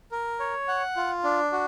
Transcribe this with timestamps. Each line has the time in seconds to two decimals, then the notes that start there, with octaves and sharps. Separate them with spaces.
0.11 A#4
0.40 C#5
0.68 F#5
0.96 F4
1.24 D4
1.52 F#4